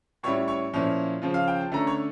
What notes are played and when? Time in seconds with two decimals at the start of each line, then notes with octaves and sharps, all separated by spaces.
0.23 A2 G3 C#4 E4 C#5 C#6
0.48 C#5 C#6
0.73 A#2 F3 C#4 E4
1.22 C#3 F3 C#4 F4
1.34 F5
1.48 G5
1.60 A5
1.72 D3 A3 C#4 A#5
1.87 C#5 C#6